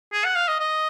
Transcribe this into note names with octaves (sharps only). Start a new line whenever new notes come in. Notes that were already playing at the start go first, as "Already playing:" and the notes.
G#4
F#5
F5
D#5
D#5